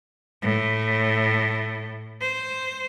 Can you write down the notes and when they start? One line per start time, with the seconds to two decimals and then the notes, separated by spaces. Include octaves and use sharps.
0.43 A2
2.21 C5